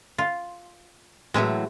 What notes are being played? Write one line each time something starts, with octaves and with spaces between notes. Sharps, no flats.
F4
A2 E3 F#3 G#3 E5 G#5